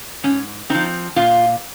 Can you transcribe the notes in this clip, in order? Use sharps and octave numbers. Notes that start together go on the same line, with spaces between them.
G#2 C#4
F3 C4 D#4
A#2 F4